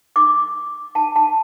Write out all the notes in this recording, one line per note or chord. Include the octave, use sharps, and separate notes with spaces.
D6
A5
A5